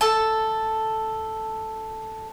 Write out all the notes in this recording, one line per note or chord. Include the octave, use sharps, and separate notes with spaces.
A4 A5